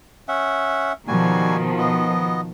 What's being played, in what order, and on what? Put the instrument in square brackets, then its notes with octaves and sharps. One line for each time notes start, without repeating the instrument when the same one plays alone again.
[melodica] C#4 E5 F#5
[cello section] B2 D#3 F3 [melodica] G3 F#4 G#5
[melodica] B3 D#5